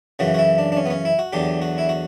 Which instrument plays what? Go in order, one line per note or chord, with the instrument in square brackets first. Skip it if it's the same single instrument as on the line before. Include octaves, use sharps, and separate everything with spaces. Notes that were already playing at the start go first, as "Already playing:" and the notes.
[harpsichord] F#2 C#3 E3 F#4
F#4
E4
D4
D4
C#4
B3
C#4
E4
F#4
E2 D3 F#3 G4
F#4
E4
F#4